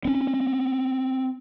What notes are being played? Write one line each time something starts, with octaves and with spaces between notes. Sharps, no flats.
C4 C#4